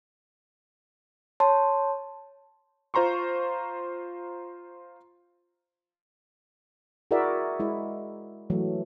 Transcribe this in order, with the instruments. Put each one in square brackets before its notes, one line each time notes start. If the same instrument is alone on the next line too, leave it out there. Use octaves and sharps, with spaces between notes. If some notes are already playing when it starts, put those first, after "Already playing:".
[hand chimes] C#5 A5 C6
[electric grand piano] F4 C5 A#5 C6 C#6
[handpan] E4 F#4 G#4 A#4 D5 E5
G#3 E4
E3 F#3 A3